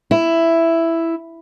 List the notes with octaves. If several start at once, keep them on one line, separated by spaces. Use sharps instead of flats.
E4